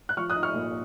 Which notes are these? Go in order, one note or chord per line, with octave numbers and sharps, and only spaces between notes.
F#6
F3 C#6 F6
D#6 F#6
D#4
C#6 F6
A#2